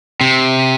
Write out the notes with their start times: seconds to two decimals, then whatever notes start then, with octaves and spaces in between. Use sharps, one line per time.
0.21 C3